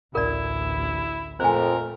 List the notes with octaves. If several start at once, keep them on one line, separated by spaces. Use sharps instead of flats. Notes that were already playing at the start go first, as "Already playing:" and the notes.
A1 D2 E4 A#4 D5
F2 A#2 A3 A#4 C5 G#5